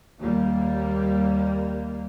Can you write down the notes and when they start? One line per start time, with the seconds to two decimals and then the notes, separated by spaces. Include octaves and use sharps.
0.19 D#2 G3 A#3